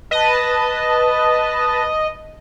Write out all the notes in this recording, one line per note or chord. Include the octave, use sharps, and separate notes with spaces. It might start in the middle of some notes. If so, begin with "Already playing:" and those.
B4 D#5 A5